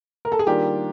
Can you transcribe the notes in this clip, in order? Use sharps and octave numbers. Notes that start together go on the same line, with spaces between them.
A#4
A4
G#4
D#3 G3 A#3 D4 F4 G4